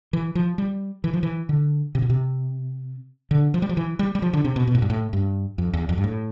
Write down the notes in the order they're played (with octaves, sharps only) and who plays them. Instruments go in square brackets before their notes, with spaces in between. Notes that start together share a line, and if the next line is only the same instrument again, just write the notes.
[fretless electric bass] E3
F3
G3
E3
F3
E3
D3
C3
B2
C3
D3
F3
G3
F3
E3
G3
G3
F3
D3
C3
B2
B2
A2
G2
A2
G2
F2
E2
F2
G2
A2